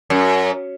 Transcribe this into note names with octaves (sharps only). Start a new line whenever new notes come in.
F#2